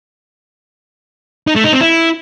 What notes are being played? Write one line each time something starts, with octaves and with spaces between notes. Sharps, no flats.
D#4
A3
D#4
C4
E4